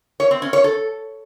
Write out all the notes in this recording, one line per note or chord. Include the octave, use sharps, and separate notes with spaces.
C#5
C4
C#4
C#5
A4